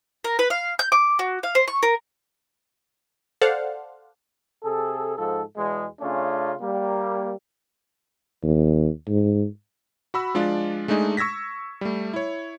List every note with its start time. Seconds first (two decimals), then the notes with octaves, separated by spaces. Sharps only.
0.24 A#4
0.39 B4
0.50 F5
0.79 G6
0.92 D6
1.19 F#4
1.43 F5
1.55 C5
1.68 C#6
1.83 A#4
3.41 A4 C5 D5 F5 F#5 A5
4.64 C3 G#4 A4
5.17 G#2 F3 A4
5.57 E2 B2 G#3
6.01 C#3 A3 C#4 D4 F4
6.61 G3 A#3
8.43 D#2
9.09 G#2
10.14 F#4 B5 E6
10.34 F3 G#3 D4 F4 D5
10.88 G#3 A3 D4 D#4 G#4
11.17 C#6 E6 G#6 A#6 B6
11.81 G3 A3
12.13 E4 C#5